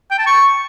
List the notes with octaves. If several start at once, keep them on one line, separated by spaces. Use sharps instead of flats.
G5
A5
C#6